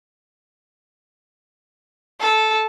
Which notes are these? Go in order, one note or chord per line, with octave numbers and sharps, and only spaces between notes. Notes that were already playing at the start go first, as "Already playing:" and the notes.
A4